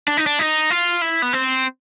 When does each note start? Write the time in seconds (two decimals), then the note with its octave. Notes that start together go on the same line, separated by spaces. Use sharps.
0.08 D4
0.17 D#4
0.26 D4
0.39 D#4
0.70 F4
1.02 E4
1.22 B3
1.33 C4